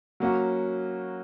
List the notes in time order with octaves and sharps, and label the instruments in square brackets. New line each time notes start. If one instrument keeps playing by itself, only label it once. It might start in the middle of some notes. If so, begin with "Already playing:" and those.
[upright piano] F#3 A#3 C#4 F#4